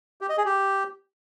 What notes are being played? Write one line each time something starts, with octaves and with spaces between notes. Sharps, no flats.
G4
D#5
G#4
G4